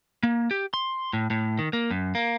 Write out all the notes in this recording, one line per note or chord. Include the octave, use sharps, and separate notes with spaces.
A#3
G4
C6
A2
A2
D#3
A#3
F#2
A#3